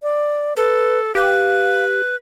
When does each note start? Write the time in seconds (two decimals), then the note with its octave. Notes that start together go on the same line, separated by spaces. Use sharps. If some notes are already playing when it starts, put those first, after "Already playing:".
0.03 D5
0.57 A4 B4
1.15 G4 B4 F5